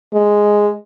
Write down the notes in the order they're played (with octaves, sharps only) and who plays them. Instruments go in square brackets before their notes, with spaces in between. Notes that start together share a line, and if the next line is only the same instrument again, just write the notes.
[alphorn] G#3